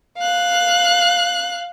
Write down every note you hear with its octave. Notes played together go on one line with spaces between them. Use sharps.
F5 F#6